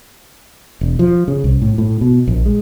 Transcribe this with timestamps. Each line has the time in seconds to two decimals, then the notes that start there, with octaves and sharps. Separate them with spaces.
0.81 E1
0.99 F3
1.28 C#3
1.44 C2
1.62 A2
1.78 A2
2.01 B2
2.27 A#1
2.46 G#3